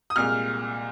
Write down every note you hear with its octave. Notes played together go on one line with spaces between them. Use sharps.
D#6
C2 A#2 G#3 F6